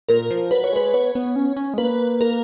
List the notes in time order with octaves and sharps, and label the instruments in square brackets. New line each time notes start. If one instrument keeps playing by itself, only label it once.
[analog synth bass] A#2 [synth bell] A#4
[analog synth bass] F3
[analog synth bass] F#3 [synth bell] B4
[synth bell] C#5
[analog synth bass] G#3 [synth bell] B4
[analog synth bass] B3 [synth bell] C#5
[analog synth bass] B3
C#4
C#4
G#3
[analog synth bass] A#3 [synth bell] B4
[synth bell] A#4